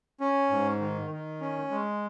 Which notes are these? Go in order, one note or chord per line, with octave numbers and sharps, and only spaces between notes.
C#4
G#2
D#3
D#3
C#4
G#3